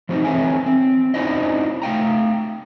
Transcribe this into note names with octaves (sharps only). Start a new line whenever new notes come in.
F3 F#3 C4 C#4 D#4
E3 C4 A4 C#5 E5 G#5
C4
C#4 D#4 E4 C5 D5 D#5
A3 F5 G5 A#5